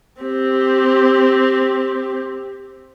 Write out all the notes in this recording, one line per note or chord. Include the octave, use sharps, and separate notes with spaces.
C4 G4